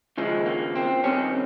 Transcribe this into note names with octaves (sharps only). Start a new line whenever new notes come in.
D#2 C#3 F3 G#3
A#3
C4
C2 C3 D#3 C#4